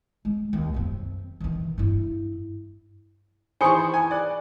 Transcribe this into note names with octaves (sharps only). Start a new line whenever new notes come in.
G#3
D#2
F#2 C4
D#3 E3
G2 E4
D#3 E3 C5 G#5 B5 C#6 D#6 C#7
B5
G#5
D5 F#6